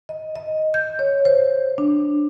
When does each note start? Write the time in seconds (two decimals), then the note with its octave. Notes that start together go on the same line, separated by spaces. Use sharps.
0.09 D#5
0.36 D#5
0.74 G6
0.99 C#5
1.25 C5
1.78 D4